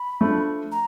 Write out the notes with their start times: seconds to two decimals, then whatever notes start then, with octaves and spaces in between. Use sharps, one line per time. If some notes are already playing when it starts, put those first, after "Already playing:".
Already playing: B5
0.21 F3 A3 D4
0.72 A#5